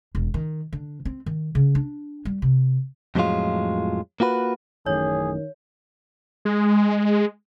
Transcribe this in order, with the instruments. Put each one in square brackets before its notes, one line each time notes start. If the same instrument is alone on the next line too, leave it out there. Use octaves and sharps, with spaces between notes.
[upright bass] E1
D#3
D3
C4
D#3
C#3
D4
G3
C3
[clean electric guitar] F2 A2 F3 F#3 G#3 F4
A#3 F4 F#4 B4
[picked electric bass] A1 F#2 A2 [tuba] D#3 [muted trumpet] G#4 [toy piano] C#5
[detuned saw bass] G#3